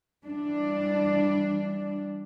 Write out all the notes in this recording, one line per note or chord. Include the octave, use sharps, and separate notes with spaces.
E3 G3 D4